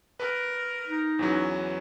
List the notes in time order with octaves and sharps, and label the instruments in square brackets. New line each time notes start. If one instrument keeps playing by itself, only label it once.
[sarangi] A#4 [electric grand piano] B4
[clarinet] D#4
[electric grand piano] E2 E3 F#3 [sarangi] C#4